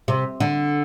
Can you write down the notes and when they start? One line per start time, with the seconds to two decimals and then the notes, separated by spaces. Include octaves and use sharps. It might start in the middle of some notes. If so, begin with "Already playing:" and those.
0.08 C3
0.40 D3